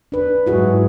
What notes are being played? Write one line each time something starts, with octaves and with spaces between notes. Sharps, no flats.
D4 B4
G#2 F#3 E4 F#4 G#4